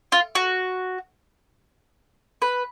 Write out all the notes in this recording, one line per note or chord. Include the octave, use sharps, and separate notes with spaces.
F4
F#4
B4